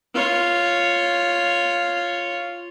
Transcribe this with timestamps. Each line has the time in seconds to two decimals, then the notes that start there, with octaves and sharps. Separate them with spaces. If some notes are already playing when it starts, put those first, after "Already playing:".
0.15 F4 C#5